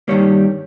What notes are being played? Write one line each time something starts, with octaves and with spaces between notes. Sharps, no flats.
G2 D#3 G3 A#3 C#5